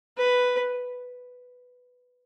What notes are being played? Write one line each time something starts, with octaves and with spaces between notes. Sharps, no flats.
B4